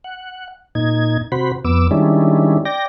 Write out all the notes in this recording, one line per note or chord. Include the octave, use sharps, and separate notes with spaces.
F#5
A#2 D#4 G#6
C3 F#4 C5 B5
F2 B3 D6 E6
D#3 G3 G#3 C#4 D4 E4
D5 G5 A#6